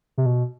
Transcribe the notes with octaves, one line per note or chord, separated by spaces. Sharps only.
C3
B2